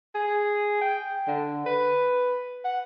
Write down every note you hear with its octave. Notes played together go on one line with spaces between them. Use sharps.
G#4
G5
D3
B4
F#5